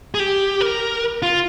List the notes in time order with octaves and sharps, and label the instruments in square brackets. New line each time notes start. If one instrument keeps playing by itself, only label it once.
[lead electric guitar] G#4
G4
A#4
F4